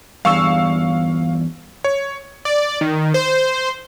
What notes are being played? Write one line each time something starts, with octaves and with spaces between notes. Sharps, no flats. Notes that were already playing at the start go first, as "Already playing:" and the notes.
E2 G2 F5 C#6 E6
C#5
D5
D#3
C5